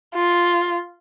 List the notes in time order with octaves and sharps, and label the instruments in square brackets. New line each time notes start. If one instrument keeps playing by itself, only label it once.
[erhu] F4